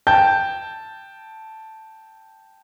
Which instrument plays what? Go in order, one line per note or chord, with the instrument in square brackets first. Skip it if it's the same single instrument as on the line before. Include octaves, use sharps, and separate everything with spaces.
[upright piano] G5 A5 G6